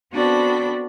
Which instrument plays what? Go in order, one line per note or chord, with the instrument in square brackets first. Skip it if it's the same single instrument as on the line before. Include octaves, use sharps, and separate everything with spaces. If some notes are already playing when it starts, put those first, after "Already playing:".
[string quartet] B3 C4 D4 F#4 A4 B5